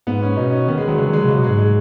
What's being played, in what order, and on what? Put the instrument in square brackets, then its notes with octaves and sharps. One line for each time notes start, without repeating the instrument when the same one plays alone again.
[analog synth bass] G#2 [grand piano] B3
[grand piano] C#4
[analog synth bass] B2 [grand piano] D#4
[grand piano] C#4
[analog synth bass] D#3 [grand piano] B3
[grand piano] G#3
[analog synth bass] D#3 [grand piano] F#3
[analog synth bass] C#3 [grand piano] G#3
[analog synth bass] D#3
[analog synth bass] F#3 [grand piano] G#3
[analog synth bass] B2
[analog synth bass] C#3 [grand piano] F#3
[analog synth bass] B2
[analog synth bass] G#2 [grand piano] G#3
[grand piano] G#3